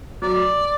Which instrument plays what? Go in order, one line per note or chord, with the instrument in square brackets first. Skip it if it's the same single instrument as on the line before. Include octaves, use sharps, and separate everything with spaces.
[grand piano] F#3 [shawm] D5